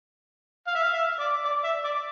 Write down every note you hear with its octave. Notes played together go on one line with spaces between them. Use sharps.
F5
E5
F5
E5
D5
D5
E5
D5